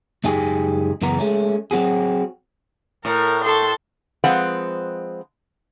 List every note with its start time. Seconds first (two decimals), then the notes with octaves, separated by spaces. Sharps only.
0.24 C#2 F#2 D#4 G4 G#4 G#5
1.02 F#2 C#3 E3 B3 A#5
1.19 G#3 A3 C#4
1.71 F#3 C4 F#4 G#4
3.05 A2 A#4
3.44 A4 A5 C6
4.24 F3 G#3 C4 B4 F#5